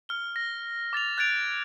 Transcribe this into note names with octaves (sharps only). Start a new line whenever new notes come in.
F6 G7
A#6
D6 A6 A#6 F7
F#6 G#6 A6 D7 F7